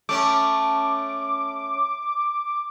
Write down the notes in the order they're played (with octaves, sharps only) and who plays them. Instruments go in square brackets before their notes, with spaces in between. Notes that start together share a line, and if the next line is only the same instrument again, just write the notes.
[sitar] A3 C#4 [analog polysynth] D6